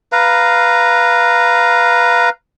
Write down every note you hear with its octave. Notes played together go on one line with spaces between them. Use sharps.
B4 F5 A#5